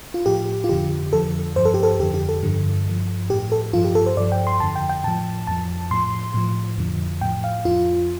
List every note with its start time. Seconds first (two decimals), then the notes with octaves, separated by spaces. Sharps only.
0.14 F4
0.26 A2 F3 G4
0.64 F4
0.69 F2 D3 F3 G4
1.13 F2 D3 F3 A4
1.56 G2 F3 C5
1.65 A4
1.74 G4
1.83 A4
1.99 F2 D3 F3 G4
2.14 G4
2.29 A4
2.43 G2 D3 F3
2.87 G2 F3
3.30 A2 F3 G4
3.52 A4
3.73 G2 F3 F4
3.84 G4
3.95 A4
4.06 C5
4.17 G2 F3 D5
4.32 G5
4.47 C6
4.60 F2 D3 F3 A5
4.76 G5
4.89 G5
5.04 A2 F3 A5
5.47 F2 F3 A5
5.91 A2 F3 C6
6.34 A2 F3
6.78 F2 D3 F3
7.21 A2 F3 G5
7.44 F5
7.65 F2 F3 F4